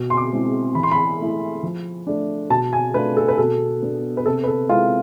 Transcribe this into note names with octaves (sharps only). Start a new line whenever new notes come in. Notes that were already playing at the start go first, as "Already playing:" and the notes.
Already playing: B2
C6
D6
G#3 C4 E4
E3 B5
C6
B5
A3 E4
F3
A3 D4
B2 A5
G#5
A3 D4 F4 B4
A4
B4
B2 A4
B3 D4
B4
C3 A4
B4
A4
G#3 C4 E4 F4